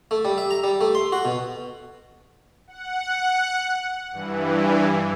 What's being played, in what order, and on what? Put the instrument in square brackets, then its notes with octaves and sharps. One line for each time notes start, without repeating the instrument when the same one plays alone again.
[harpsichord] A3
G3
E5
A#5
G3
A3
C6
F#4
B2
[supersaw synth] F#5
G2 E3